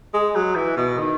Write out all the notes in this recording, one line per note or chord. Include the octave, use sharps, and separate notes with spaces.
G#3
F#3
E3
B2
D#3